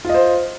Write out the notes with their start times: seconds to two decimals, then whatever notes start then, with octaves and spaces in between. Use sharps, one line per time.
0.05 F4
0.09 D#5
0.14 C5